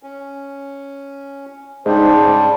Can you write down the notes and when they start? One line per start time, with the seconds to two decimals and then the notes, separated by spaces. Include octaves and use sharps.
0.03 C#4
1.86 G#2 C#3 G3 D4 C5